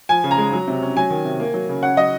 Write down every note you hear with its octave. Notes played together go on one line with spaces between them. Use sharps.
F3 G#5
C#3
A#5
G#3
F#3
C3
C#4
F#3 G#5
D#3
C3
A#3
F#3
C#3
C#4 F#5
F#3 D#5